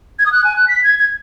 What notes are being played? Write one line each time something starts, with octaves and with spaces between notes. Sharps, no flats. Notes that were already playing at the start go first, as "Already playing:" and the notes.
G#6
D#6
F#6
G#5
F#6
B6
G#6
G#6